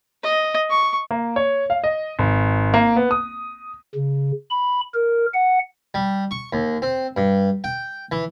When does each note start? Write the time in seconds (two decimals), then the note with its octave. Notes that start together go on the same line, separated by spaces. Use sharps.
0.23 D#5
0.70 C#6
1.11 A#3
1.36 C#5
1.70 F5
1.84 D#5
2.19 G#1
2.74 A#3
2.96 B3
3.11 D#6
3.95 C#3
4.50 B5
4.94 A#4
5.34 F#5
5.94 G3
6.31 C#6
6.53 D#2
6.82 C4
7.17 G2
7.64 G5
8.12 E3